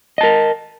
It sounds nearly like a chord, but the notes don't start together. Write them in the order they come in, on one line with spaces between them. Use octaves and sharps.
D#5 A5 A#4